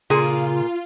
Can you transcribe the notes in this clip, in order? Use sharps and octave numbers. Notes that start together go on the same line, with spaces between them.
A#2 C#3 F4 G#4